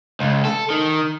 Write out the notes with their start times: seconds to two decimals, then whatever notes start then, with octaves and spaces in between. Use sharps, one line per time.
0.20 C#2
0.45 A4
0.70 D#3